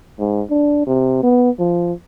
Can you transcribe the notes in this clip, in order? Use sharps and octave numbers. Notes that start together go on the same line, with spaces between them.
G#2
D4
C3
B3
F3